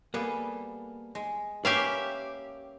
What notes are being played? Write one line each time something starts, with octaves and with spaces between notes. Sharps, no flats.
G3 A#3 B3 G#4 A4
G#3
A#3 C#4 G4 B4 E5 F5 G5 A#5